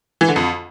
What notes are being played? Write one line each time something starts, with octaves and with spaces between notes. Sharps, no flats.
E3
D3
F2